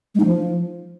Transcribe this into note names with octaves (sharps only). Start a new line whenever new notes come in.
G#3
D#4
F3